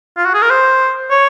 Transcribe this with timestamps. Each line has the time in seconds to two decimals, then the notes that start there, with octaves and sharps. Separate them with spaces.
0.17 F4
0.25 F#4
0.34 G#4
0.42 A#4
0.50 C5
1.10 C#5